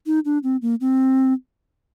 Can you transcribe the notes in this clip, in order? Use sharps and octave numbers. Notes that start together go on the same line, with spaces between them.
D#4
D4
C4
A#3
C4